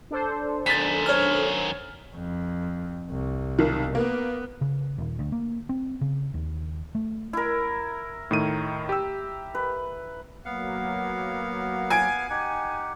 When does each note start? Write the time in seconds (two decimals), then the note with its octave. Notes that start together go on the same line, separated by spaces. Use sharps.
0.11 D4 A4 C5
0.66 F#2 D#3 A6 B6
1.06 C#5 F6
2.15 F2
3.10 C2
3.59 B1 D#3
3.95 A#3 B3
4.61 C#3
4.98 D#1
5.19 D2
5.32 A#3
5.69 C4
6.01 C#3
6.34 D#2
6.95 A3
7.33 E4 A#4
8.31 A2 D#3 D#7
8.89 G4 E6
9.55 B4
10.45 F#3 A#3 B3 F5 F#5
11.90 G#5 G#6 D7
12.30 D#4 G4 F#5